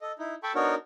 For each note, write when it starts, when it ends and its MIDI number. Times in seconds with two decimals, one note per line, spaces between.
0.01 0.12 69
0.01 0.12 75
0.19 0.35 63
0.19 0.35 64
0.43 0.52 69
0.43 0.52 79
0.43 0.52 81
0.43 0.52 83
0.43 0.52 85
0.55 0.75 59
0.55 0.75 62
0.55 0.75 63
0.55 0.75 66
0.55 0.75 70
0.55 0.75 73